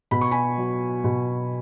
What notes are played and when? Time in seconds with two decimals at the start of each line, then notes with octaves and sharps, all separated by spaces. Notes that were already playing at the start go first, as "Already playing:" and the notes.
0.11 B2 B5
0.21 C#6
0.31 G#5 B5
0.58 F#3
1.04 B2